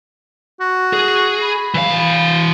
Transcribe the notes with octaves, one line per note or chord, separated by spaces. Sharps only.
F#4
G#4
B5
E3 F5